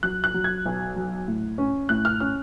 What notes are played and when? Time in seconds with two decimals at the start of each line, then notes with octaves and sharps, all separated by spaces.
0.03 F#3 F#6
0.24 F#6
0.34 F#3
0.44 G#6
0.66 B1
0.96 F#3
1.28 A2
1.58 C#4
1.89 A2 F#6
2.05 F6
2.20 C#4 F6